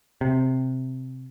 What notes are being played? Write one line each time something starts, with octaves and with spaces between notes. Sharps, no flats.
C3